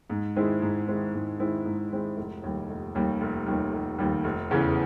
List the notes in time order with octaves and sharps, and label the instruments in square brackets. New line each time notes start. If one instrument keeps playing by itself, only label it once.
[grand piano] G#2
D#3 G#3 C4 E4
G#2
D#3 G#3 C4 E4
G#2
D#3 G#3 C4 E4
G#2
D#3 G#3 C4 E4
F1
D#2 D#3 G3
F1
D#2 D#3 G3
F1
D#2 D#3 G3
F1
D#2 D#3 G3
F1
E2 C#3 E3